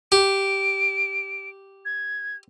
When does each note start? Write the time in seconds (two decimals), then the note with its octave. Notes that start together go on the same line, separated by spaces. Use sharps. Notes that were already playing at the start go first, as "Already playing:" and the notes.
0.12 G4 D7
1.85 G#6